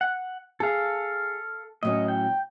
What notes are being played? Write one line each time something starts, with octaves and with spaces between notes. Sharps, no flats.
F#5
G#4 A4 F5
A2 F#3 C#4 D#5
G5